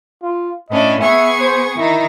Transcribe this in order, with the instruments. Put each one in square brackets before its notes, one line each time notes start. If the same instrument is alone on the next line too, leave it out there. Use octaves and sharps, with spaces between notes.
[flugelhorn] F4
[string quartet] A2 C#4 D4 [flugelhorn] D#5
[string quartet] B3 G#4 C#6 [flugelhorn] E5
[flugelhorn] C5
[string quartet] D#3 D#4 [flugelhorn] E4